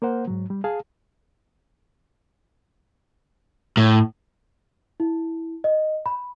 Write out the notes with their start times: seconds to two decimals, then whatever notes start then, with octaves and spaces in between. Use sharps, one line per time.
0.02 A#3 A#4 C5 F#5
0.27 G#2 F#3
0.50 G3
0.64 G#4 F5 A5
3.77 A2
5.00 E4
5.64 D#5
6.06 B5